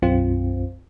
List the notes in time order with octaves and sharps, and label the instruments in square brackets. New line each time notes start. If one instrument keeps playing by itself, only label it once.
[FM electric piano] B1 F#2 C4 F4